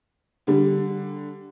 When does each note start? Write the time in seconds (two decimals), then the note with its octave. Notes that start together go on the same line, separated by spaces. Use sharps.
0.47 D3 G3